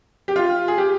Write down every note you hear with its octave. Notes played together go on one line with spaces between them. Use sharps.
G4
F4
G#4
G4